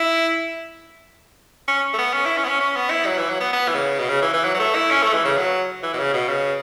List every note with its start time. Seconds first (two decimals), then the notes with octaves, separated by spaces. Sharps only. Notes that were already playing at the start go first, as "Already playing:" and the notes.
Already playing: E4
1.68 C#4
1.93 A3
1.99 B3
2.13 C#4
2.26 E4
2.37 C#4
2.44 B3
2.48 C#4
2.60 C#4
2.76 B3
2.90 E4
3.06 F#3
3.18 E3
3.29 F#3
3.40 B3
3.53 B3
3.68 E3
3.75 C#3
3.99 B2
4.09 C#3
4.22 E3
4.34 E3
4.44 F#3
4.55 F#3
4.60 A3
4.75 E4
4.91 C#4
5.02 A3
5.13 E3
5.25 C#3
5.37 F#3
5.83 E3
5.93 B2
5.98 C#3
6.13 B2
6.29 C#3